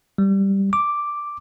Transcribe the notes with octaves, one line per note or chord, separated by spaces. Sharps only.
G3
D6